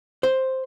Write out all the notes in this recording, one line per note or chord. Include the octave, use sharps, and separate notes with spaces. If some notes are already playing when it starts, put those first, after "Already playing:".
C5